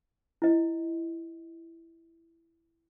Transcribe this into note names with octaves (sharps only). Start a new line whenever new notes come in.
E4 D#5